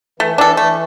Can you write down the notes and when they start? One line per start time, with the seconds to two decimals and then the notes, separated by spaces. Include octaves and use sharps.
0.20 E3 A3
0.38 E3 D4 A4
0.57 E3 A3